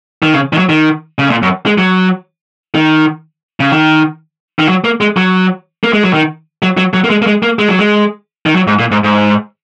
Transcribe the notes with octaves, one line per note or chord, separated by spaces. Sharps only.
D#3
C#3
D#3
F#3
D#3
C#3
A#2
F#2
G#3
F#3
D#3
C#3
D#3
D#3
F#3
A#3
G#3
F#3
A#3
G#3
F#3
D#3
F#3
F#3
F#3
A#3
G#3
A#3
G#3
A#3
G#3
F#3
G#3
D#3
F#3
G#2
A#2
G#2
G#2